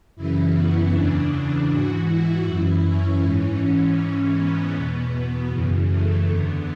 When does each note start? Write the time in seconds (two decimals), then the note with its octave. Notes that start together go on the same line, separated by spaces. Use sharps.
0.16 F#2 C#3 E3 E4
0.55 B3
0.93 E2 C#3 E3 D4
1.68 G#2 E3 F#4
2.08 E4
2.45 F#2 E3
2.84 C#4
3.22 G#2 E3
3.98 G#2 E3
4.36 B3
4.74 E2 B2
5.51 F#2 C#3 E3
5.88 A3
6.26 E2 D3 B3